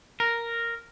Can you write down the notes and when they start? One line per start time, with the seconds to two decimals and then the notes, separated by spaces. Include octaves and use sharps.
0.20 A#4